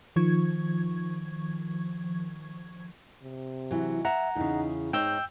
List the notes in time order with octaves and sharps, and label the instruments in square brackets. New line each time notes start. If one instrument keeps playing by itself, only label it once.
[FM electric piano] D#3 F3 C#6 G#6
[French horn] C3
[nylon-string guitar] E3 F#3
[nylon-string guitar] E5 [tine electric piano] F#5 A#5
[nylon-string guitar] E2 C#3 [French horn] D#4
[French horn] G#2 [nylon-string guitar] D#4 C#5 [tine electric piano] G5 E6 G6